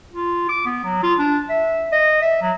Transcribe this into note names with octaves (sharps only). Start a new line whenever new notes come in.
F4
D6
B3
F#3
F4
D4
E5
D#5
E5
F#3